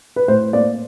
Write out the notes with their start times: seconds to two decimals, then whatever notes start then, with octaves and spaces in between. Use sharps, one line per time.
0.16 B4
0.28 A2 C5
0.53 A#3 D5